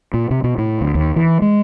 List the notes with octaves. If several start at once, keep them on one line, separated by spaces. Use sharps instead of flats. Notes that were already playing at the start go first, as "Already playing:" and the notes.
A#2
C3
B2
A2
D2
D#2
E3
G#3